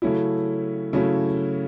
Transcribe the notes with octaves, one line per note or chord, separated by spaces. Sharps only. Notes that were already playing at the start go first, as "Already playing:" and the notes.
C#3 F#3 A3 C#4 E4
C#3 F#3 A3 C#4 E4